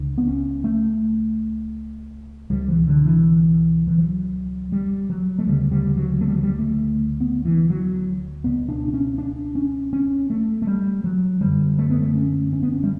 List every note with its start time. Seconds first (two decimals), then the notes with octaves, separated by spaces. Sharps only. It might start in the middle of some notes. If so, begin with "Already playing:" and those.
Already playing: C#2 C#3 D4
0.18 B3
0.27 C#4
0.64 A3
2.50 C#2 B2 G3
2.68 E3
2.87 D3
3.05 E3
3.87 E3
3.98 F#3
4.72 G3
5.10 F#3
5.39 A3
5.47 D2 C#3 G3
5.71 G3
5.96 F#3
6.21 A3
6.28 G3
6.36 F#3
6.43 G3
6.59 A3
7.20 B3
7.45 E3
7.70 F#3
8.44 C#2 B2 B3
8.69 D4
8.88 D4
8.94 C#4
9.18 D4
9.55 C#4
9.93 C#4
10.30 A3
10.62 A3
10.67 G3
11.04 F#3
11.41 F#2 D3 G3
11.78 A3
11.90 B3
12.01 A3
12.15 C#4
12.53 C#4
12.63 B3
12.73 C#4
12.83 G3